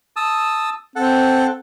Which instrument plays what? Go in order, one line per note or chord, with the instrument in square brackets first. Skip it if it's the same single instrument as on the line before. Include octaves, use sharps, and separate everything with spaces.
[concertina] A5 D#6 E6
[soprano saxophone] C4 [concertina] A4 F#5